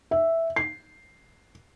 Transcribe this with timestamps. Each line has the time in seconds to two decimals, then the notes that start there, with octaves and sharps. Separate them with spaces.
0.11 E5
0.56 C7